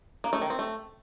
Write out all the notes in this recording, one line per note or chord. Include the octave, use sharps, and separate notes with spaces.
A#3
A3
D#3
C4
A3